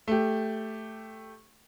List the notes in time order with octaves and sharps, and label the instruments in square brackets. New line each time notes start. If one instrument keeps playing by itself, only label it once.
[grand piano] A3 G4